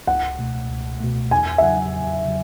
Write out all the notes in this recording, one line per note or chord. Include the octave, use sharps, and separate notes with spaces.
C#2 F#5
B2 A3
C#2
B2 A3
E2 G#5
E5
C#3 F#3 F#5
E2
C#3 F#3